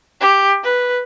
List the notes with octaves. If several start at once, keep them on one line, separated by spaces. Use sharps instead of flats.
G4
B4